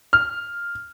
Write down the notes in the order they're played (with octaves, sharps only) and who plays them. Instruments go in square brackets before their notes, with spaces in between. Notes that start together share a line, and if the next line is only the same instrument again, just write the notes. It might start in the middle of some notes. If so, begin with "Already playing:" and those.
[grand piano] F6